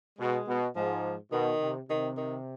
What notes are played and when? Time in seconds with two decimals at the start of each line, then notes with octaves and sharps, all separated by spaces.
0.18 B2 G#3
0.47 B2
0.76 G#2 F3
1.32 B2 D#3
1.60 C3
1.89 C3 D#3
2.17 D#3